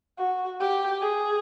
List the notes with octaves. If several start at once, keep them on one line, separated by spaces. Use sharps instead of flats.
F#4
G4
G#4